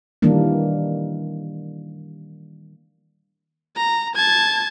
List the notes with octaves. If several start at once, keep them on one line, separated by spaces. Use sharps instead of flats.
D#3 E3 G3 A#3 D4
A#5
A5 G#6